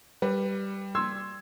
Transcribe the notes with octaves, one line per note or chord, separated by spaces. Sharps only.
G3 B4
C6 E6 G#6